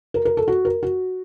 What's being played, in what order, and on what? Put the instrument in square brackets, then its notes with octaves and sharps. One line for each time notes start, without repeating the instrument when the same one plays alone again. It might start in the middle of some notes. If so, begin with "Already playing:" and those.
[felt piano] A#4
A#4
A4
F#4
A#4
F#4